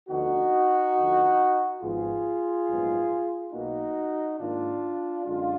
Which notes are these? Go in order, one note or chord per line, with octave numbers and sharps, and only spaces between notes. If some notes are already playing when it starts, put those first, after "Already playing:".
D2 D3 F3 B3 D#4 F#4
D2 D3 F3
G#1 G#2 F3 B3 F4 G#4
A#1 G#2 F#3 B3
B1 B2 A#3 D#4 F#4
G#2 D#3 A#3 D4 F4
F#2 D3 G#3 D4 F4